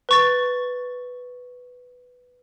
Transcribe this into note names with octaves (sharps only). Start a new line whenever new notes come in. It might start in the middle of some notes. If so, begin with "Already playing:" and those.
B4 C#6 A6